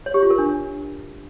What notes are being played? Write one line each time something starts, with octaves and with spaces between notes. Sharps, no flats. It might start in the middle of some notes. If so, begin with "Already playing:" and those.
C#5
G4
F4
A#4
D4